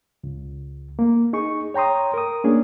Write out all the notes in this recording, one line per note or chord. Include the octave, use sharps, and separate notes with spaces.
C#2
A#3
D#4 G#4 C#6
C#5 G5 A#5 C6 D#6
A#4 D#6
A#3 C#4 D4 G#4